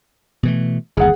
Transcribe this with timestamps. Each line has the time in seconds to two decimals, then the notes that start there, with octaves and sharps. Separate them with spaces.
0.43 B2 E3 A3
0.97 G1 D#2 G#4 F#5